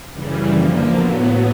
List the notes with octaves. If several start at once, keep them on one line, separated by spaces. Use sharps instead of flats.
F#2 C#3 E3 G3
D3 F3 A#3
A2 F#3 B3